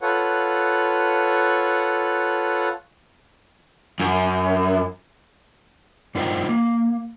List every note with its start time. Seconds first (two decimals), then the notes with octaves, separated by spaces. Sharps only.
0.01 F4 A4 B4 C#5 F#5
4.00 F#2
6.15 G2 D#4 F4 A#4 C5 G5
6.49 A#3